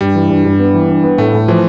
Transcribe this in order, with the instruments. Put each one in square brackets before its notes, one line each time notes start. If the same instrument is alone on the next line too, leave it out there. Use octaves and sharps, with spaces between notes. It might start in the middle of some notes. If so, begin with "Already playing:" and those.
[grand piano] G2 [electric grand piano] G3
[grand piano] E3
G2
G2
B3
E3
D4
B3
[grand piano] A2 [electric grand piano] A3
[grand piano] A2
[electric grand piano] E3 [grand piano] F3